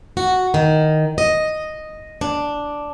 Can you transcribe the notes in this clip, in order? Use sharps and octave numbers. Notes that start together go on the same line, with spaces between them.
F#4
D#3
D#5
D4